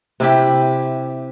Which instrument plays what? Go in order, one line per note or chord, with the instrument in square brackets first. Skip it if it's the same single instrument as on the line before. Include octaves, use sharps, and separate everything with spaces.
[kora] C3 E4 G4